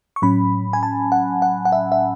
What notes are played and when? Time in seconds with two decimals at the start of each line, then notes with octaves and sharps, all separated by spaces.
0.16 C#6
0.22 A2 F#3 C#4 B5
0.73 G#5
0.83 A5
1.12 F#5
1.42 F#5
1.65 F#5
1.72 E5
1.92 E5